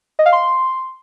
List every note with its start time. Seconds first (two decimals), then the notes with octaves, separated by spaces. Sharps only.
0.19 D#5
0.26 F5
0.33 C6